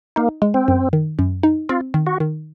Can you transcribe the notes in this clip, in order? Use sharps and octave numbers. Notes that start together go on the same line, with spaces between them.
A#3 D#4
G#3
C4
F#2
D#3
F#2
D#4
C4 F4
D#3
F#4
D#3